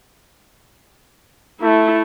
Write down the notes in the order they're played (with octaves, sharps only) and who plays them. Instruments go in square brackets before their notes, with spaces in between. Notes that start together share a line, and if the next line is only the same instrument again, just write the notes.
[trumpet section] A3 [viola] E4